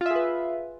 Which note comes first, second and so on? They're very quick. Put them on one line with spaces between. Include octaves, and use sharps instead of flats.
F4 E5 G#4 B4